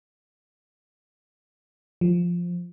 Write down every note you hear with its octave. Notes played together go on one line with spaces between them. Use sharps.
F3